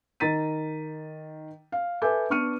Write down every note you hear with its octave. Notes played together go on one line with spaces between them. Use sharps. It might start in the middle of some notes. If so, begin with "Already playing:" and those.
D#3 A#5 A6 B6 D#7
F5
A4 B4 E5 G#5 D6 G6
B3 D4 C#6 F6 C#7 D#7